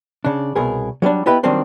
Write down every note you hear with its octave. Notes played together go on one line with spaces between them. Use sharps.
C#3 D4
C2 B2 G#4 A#4
F#3 G3 A#3 D4
B3 E4 G4 B4 D#5 G5
D#3 F#3 G3 A#3 C4 D4